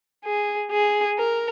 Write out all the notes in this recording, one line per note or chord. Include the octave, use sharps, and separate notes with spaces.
G#4
G#4
A#4